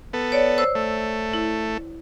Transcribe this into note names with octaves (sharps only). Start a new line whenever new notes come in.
B3 A4
C#5 D5
C5 E6
A3
E4